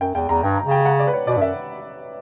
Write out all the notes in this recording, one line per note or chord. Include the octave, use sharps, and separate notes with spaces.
F#2 G5
E2 G5
E2 A#5
G2 G5
A#5
C#3
G5
F#5
D5
B4
C#5
B2 D5
G2
F#2 E5